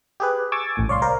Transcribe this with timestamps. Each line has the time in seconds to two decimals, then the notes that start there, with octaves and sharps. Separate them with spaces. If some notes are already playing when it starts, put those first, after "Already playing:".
0.20 G4 G#4 B4
0.52 G#5 C#6 D6 E6 G#6 A6
0.76 A1 A2 G#5
0.88 C2 C#5 D5 F5 C6
1.02 A#4 C5 D5 F5